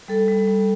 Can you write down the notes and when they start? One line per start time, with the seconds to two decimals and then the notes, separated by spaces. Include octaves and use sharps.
0.08 G3 A4
0.28 G3
0.47 G3